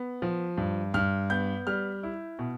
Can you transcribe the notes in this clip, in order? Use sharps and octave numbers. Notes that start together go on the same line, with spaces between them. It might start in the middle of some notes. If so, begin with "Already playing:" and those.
Already playing: B3
F3
G2
G2 F6
B3 G6
G3 F6
E4
B2